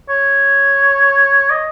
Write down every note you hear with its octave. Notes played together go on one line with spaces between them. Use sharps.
C#5
D#5